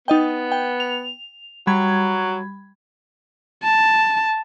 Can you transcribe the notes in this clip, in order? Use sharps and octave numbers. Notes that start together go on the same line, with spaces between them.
B3 D#4 D#5 G5
G5
F7
F#3 G3 B5 G#6
A5